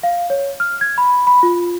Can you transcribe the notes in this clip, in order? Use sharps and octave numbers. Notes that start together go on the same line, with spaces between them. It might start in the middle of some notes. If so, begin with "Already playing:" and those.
F5
C#5
F6
G#6
B5
B5
F4